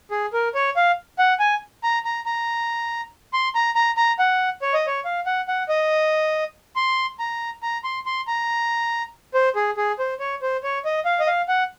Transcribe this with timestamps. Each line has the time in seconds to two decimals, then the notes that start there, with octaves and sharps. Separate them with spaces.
0.11 G#4
0.33 A#4
0.55 C#5
0.76 F5
1.19 F#5
1.39 G#5
1.84 A#5
2.05 A#5
2.26 A#5
3.33 C6
3.55 A#5
3.76 A#5
3.97 A#5
4.19 F#5
4.62 C#5
4.74 D#5
4.87 C#5
5.05 F5
5.26 F#5
5.48 F#5
5.69 D#5
6.76 C6
7.20 A#5
7.63 A#5
7.84 C6
8.06 C6
8.27 A#5
9.34 C5
9.55 G#4
9.77 G#4
9.99 C5
10.20 C#5
10.42 C5
10.63 C#5
10.85 D#5
11.05 F5
11.20 D#5
11.27 F5
11.48 F#5